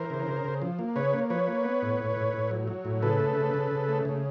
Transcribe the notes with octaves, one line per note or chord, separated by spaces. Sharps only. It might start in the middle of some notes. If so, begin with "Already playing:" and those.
Already playing: E3 A#4 C5
C#3
C#3
C#3
F3
A#3
C#3 B4 C#5
A#3
F3 B4 C#5
A#3
B3
A2
A2
A2
A2
F#3
F#3
A2
C#3 A4 B4
A3
C#3
C#3
C#3
A3
C#3